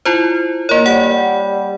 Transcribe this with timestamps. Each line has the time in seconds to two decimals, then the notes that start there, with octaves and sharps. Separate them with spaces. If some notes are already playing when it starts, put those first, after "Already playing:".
0.05 E4 F4 C5
0.69 A#3 A#4 C#5
0.86 G3 F#5